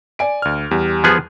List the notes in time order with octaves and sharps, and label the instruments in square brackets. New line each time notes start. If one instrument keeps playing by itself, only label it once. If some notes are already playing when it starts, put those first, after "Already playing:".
[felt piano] D5 G#5 D7
[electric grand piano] D2 F6
[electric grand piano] E2 [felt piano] G3
[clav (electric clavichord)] F3 B3 G#4